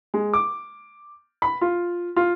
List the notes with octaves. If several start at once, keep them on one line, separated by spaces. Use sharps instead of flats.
G#3
D6
B5
F4
F4